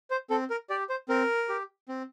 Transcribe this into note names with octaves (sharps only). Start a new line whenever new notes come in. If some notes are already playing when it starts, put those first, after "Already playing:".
C5
C4 A4
A#4
G4 D5
C5
C4 A#4
G4
C4